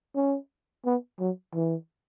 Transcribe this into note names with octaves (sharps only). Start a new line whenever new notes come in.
C#4
B3
F#3
E3